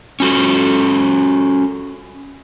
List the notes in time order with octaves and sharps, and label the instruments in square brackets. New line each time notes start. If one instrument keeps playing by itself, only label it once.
[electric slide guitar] C#4 F#4 A4